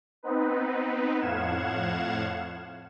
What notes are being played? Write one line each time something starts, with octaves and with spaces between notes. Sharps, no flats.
B3 C4 D#4 B4
F2 A2 F5 F#5 G#6 E7